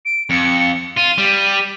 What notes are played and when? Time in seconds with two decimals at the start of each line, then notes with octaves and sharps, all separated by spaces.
0.05 D7
0.30 F2 C#7
0.97 F4 D#7
1.18 G3